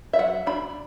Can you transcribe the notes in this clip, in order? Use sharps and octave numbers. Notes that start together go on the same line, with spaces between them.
E5
F#3 F#5
D4 B5